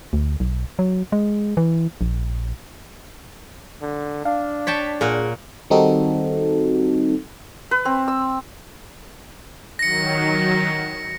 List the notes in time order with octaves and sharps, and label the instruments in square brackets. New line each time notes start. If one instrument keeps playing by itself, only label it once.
[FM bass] D2
B1
F#3
G#3
E3
A#1
[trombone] D3
[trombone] D4 [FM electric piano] F5
[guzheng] C#5 G5 A5 [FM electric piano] B6
[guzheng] A#2 A#4 F#5 [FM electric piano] G#4
[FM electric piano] D#3 G3 C4 D#4 F#4 A4
[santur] B4
C4
E6
[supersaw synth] D#3 F#3 [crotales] A#6 C#7